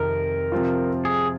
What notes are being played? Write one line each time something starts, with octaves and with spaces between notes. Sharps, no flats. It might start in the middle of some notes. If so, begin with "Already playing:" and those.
Already playing: F2 C3 D#3 A#4
C3 F3 C4 F4
G#4